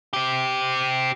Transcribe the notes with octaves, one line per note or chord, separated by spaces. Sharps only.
C4 G4